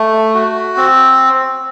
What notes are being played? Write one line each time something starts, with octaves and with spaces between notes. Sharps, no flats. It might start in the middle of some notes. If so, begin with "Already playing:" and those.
Already playing: A3
F#4
C4